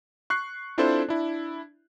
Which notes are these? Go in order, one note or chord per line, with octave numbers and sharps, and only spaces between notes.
C#6 F#6 C7
C4 D4 E4 F4 A4 C5
D4 E4